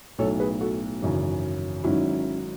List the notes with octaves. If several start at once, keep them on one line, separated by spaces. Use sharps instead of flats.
B1 A2 F#3 A4 C#5
G#4 B4
F#4 A4
G#1 F#2 C#3 E3
G#1 G#2 D#3 F#3 C#4 E4